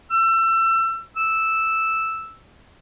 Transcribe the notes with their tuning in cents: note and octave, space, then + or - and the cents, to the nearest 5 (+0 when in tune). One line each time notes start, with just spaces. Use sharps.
E6 +25
E6 -5